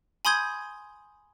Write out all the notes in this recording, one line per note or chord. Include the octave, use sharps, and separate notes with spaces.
G#5 B5 C6 D#6 G6 G#6